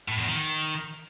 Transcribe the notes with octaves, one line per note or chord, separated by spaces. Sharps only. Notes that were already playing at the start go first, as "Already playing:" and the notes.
A2
E2
D#3